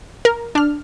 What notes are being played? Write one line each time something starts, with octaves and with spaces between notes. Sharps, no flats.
A#4
D4 F6